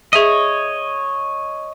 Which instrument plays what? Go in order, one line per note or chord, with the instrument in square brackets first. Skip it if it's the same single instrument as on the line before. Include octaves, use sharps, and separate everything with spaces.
[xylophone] G#4 E5 D#7 [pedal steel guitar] C#5 D#5